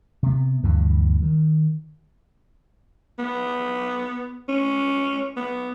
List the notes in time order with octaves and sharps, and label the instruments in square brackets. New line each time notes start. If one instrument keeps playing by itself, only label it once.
[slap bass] C3 B3
D2 G2 E3 F3
D#3
[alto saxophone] B3
C#4
B3